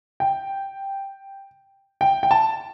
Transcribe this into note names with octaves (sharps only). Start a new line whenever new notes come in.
G5
G5
G5
A5